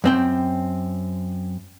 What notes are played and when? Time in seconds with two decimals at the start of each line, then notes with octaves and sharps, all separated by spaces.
0.04 F#2 C4 G5